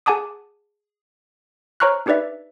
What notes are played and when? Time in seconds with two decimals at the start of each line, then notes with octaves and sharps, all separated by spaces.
0.06 G#4 F#5 G#5 A5 D6 D#6
1.80 C5 C#5 A#5 C#6 F6 F#6
2.06 D4 D#4 G4 B4 D5 E5